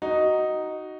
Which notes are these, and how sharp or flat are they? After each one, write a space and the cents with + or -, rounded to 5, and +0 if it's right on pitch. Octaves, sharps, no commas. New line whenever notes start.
D#4 +0 F#4 +10